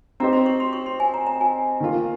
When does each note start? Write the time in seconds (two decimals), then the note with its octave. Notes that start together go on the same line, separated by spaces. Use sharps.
0.20 C4 D#4 G4 C5 A#5
0.33 C6
0.46 C#6
0.60 C6
0.73 C#6
0.86 C6
1.00 G#5
1.14 A#5
1.27 A#5
1.41 G#5
1.80 D#3 A#3 F4